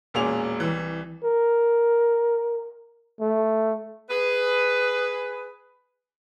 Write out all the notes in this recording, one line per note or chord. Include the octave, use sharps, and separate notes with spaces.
E1 A#2 A#3 C#4 G#4 F7
C2 E3
A#4
A3
G#4 B4